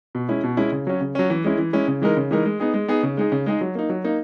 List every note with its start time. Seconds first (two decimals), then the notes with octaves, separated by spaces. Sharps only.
0.15 B2
0.29 G#3 C#4 E4
0.43 B2
0.57 G#3 C#4 E4
0.72 C#3
0.87 F#3 C#4
1.01 C#3
1.15 F#3 C#4
1.30 E3
1.44 G#3 C#4 E4
1.58 E3
1.73 G#3 C#4 E4
1.88 C#3
2.02 E3 G#3 D#4 A#4
2.17 C#3
2.31 E3 G#3 D#4 A#4
2.45 G#3
2.60 B3 D#4 G#4
2.74 G#3
2.88 B3 D#4 G#4
3.03 C#3
3.17 G#3 D#4 G#4
3.32 C#3
3.46 G#3 D#4 G#4
3.61 F#3
3.75 A#3 D#4
3.89 F#3
4.04 A#3 D#4